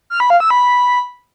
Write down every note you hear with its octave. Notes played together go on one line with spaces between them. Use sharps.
F6
B5
F5
E6
B5